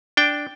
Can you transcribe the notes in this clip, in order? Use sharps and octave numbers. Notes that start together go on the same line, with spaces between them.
D4 G5